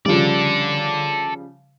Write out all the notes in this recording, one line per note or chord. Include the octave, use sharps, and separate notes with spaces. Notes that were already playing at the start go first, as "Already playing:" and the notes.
C#3 F3 G3 A4 D5